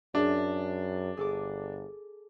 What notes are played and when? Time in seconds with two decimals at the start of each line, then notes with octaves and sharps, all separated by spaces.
0.15 F#2 D4 G#4 E5
1.17 G1 G#4 A4 D6